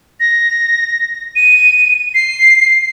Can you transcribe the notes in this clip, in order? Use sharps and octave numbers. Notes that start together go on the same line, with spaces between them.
A#6
D#7
C7